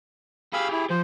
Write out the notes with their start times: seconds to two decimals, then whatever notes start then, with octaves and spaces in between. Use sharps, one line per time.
0.53 G4 G#4 F5 B5 E6
0.72 E4
0.90 F3 C5